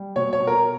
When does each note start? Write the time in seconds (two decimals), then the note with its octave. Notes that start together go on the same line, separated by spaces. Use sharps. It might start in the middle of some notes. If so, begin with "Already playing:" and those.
Already playing: G3
0.16 B2 C#5
0.33 C#5
0.40 B2
0.47 A#4